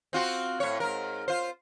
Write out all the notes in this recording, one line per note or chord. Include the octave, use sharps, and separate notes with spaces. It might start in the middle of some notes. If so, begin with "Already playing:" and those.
C4 F4 F#4
A2 C#5
G#2 A#4
F4 C5